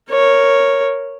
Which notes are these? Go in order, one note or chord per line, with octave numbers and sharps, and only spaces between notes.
A#4 C#5